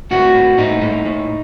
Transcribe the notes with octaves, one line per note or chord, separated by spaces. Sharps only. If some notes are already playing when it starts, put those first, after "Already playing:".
A2 F#4
A2
A2 D#4
A2
A2